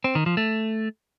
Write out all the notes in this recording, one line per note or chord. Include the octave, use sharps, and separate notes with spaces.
C4
D#3
F3
A3